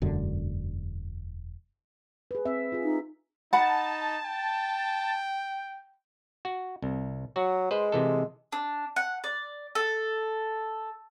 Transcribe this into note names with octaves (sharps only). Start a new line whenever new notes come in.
E1 F#2 D3
G#4 B4
C4 E5
F4 G#4
D#4
D#4 F#5 A5 B5
G5
F#4
C2
F#3 F#4
G#3 B4 C5
C3 E3 A4
D4
F#5
D5
A4